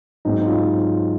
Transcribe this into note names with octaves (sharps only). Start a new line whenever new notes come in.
G#2 F#3 C4 D#4
D#4
F4